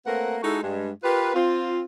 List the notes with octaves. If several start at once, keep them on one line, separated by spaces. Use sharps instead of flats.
A3 A#3 C4 A#4 B4 F#5
G#3 D#4 E4 F#4 A4
G2 G#3
F4 G4 A#4 B4
C4 F4